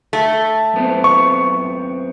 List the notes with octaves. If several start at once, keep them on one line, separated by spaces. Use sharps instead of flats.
A3
F#2 B3 C4
C#6